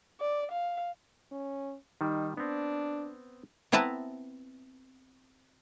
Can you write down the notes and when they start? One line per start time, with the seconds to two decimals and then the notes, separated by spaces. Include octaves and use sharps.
0.20 D5
0.52 F5
1.31 C#4
2.01 D#3 G3 D#4
2.37 B3 C4 D4
3.72 B3 C4 E4 B4 A5 A#5